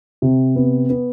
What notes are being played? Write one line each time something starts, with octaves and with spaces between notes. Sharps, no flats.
C3
B3
B3